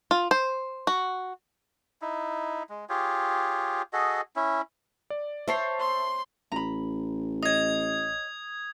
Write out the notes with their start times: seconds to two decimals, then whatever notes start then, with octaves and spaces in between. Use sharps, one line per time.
0.11 F4
0.31 C5
0.87 F#4
2.02 D#4 E4
2.69 G#3
2.89 F4 G4 G#4 C#5
3.93 F#4 G#4 A4 D#5
4.36 C#4 E4
5.10 D5
5.48 C5 C#5 E5 A5 C7
5.80 C6
6.52 A1 A#5 B5
7.43 C#5 D#5 D#6 G#6